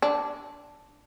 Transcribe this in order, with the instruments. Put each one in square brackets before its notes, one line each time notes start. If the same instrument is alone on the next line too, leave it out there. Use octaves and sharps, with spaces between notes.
[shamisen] D4